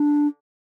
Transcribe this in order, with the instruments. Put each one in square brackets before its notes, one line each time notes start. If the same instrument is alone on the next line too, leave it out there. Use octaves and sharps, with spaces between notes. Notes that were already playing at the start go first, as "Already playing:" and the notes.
Already playing: [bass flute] D4